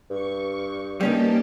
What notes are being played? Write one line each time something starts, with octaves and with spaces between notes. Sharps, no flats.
G2 C#6
G3 A#3 C#4 D#4 G4 A5